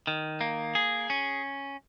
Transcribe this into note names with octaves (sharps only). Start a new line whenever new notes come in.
D#3
A#3
G#4
C#4